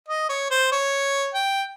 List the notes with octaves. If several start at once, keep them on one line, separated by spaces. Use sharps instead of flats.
D#5
C#5
C5
C#5
G5